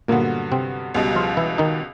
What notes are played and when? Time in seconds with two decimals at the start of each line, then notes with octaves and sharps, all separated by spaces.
0.08 G2 A#2 D3 F#3 A#3 B3
0.52 C3 C4
0.94 C#2 B2 G3
1.16 F3 F4
1.37 E3 E4
1.58 D#3 D#4